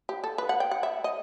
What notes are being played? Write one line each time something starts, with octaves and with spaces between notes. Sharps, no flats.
G4
A4
B4
F#5
G5
F#5
E5
D#5